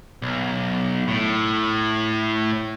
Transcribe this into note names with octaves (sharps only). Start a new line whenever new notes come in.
B1
A2